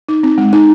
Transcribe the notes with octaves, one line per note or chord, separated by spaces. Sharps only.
D#4
C4
G#3
D#4